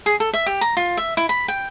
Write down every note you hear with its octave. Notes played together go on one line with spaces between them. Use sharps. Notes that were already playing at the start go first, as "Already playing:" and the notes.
G#4
A4
E5
G4
A#5
F4
E5
E4
B5
G5